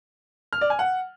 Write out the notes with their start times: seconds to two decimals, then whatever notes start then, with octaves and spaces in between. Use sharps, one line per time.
0.53 F6
0.61 D5
0.70 G#5
0.79 F#5